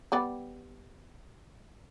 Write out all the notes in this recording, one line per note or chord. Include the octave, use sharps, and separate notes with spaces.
G3 B3 D5